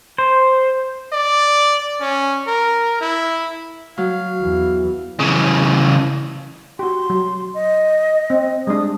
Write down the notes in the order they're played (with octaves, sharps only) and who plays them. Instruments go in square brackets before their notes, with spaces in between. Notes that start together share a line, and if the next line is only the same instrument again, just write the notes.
[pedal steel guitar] C5
[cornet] D5
C#4
A#4
E4
[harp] F#3 [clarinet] F5
[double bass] E2 E3
[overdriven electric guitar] C#3 E3
[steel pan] F#4 G4 [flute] C6
[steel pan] F#3
[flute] D#5
[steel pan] C4
[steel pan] G3 G#3 D4 [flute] D#6